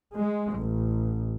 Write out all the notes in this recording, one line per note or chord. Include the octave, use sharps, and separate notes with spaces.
G#3
A1